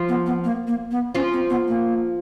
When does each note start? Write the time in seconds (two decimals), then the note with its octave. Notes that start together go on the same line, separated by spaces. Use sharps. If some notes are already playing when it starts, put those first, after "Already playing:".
Already playing: F3 F4
0.09 B3
0.26 B3
0.44 A#3
0.67 A#3
0.91 B3
1.15 F3 C#4 F4
1.33 C4
1.50 B3
1.68 A#3